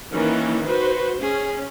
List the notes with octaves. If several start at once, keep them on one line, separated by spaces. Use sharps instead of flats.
D#3 E3 A#3 C#4
F#4 B4 C5
C#4 G#4